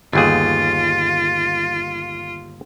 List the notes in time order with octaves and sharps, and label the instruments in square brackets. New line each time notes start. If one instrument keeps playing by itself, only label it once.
[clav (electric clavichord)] G1 D#2 G#4 [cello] F4 [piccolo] A6